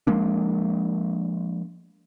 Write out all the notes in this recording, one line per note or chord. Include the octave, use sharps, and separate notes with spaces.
F3 G#3 A#3 D4